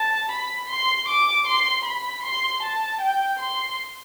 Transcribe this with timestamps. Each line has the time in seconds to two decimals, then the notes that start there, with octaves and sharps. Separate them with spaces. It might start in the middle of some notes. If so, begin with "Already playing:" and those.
Already playing: A5
0.31 B5
0.70 C6
1.08 D6
1.47 C6
1.85 B5
2.23 C6
2.63 A5
3.01 G5
3.39 C6